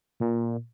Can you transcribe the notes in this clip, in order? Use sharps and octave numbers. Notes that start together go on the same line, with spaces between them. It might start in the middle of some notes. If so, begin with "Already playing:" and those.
A#2